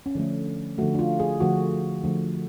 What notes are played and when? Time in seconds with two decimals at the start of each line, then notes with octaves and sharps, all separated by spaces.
0.06 C#4
0.15 D3 F3 A3 D4
0.78 D3 F3 A3 F#4
0.94 D4
0.99 F4
1.20 G#4
1.40 D3 F3 A3 F#4
2.03 D3 F3 A3